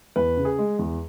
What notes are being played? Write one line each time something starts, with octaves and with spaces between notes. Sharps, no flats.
E2 B4
C#3
G#4
G#3
E2